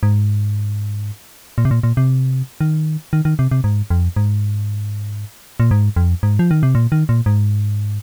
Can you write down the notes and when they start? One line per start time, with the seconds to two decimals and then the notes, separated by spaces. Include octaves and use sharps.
0.03 G#2
1.58 A#2
1.65 C3
1.71 A#2
1.83 A#2
1.97 C3
2.61 D#3
3.13 D#3
3.25 D#3
3.39 C3
3.51 C3
3.64 G#2
3.90 F2
4.16 G#2
5.60 A#2
5.71 G#2
5.96 F2
6.23 G#2
6.39 F3
6.51 D#3
6.63 C3
6.75 A#2
6.92 D#3
7.09 A#2
7.26 G#2